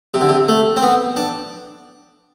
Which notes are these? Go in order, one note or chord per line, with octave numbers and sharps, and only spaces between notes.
C3
D3
C3
A3
C4
B3
D4